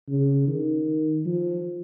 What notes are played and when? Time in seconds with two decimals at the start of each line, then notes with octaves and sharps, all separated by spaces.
0.09 C#3
0.48 D#3
1.26 F3